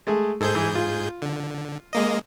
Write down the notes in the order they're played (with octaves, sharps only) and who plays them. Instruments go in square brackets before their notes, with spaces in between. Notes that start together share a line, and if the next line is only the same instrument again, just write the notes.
[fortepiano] G#3 A3 G#4
[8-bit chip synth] G#2 G#4 G6 [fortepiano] A4 C5
[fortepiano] E3
F4
[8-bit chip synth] D3
G#3 A#3 D#5